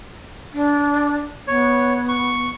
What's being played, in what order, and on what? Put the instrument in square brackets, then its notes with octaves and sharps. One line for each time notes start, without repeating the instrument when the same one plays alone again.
[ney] D4
[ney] B3 [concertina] C#5
[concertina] C#6